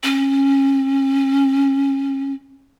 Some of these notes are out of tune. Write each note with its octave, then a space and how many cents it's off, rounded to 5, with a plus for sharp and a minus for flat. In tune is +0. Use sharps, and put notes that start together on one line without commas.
C#4 -20